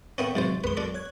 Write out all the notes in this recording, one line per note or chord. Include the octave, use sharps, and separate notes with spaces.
A3 B3 C#4 C#5 G5
G#2 C3 F#3 C5 A6
B1 F#2 G#3 B4 C6
F#3 D4 A4
C#5 F#6 G#6